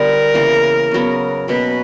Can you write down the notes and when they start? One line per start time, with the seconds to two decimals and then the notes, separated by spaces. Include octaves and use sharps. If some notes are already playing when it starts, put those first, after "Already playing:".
Already playing: D3 G3 B3 A#4
0.34 C#3 E3 A#3
0.92 C#3 F#3 B3
1.48 B2 A#3 C#4 B4